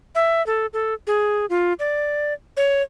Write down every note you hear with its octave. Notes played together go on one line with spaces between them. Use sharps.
E5
A4
A4
G#4
F4
D5
C#5